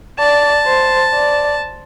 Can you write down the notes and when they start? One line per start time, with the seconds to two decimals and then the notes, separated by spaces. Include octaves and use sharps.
0.19 D5 A5
0.66 C5
1.14 D5